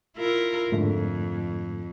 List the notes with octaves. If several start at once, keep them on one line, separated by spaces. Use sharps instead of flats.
E4 F4 A#4
F2 G#2 D3 A3